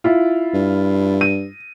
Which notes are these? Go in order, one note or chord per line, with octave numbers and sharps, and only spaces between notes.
E4 F4
G2
D#7